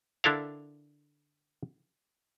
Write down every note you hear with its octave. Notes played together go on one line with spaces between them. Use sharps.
D3 D4 E4 A4 A#4 F5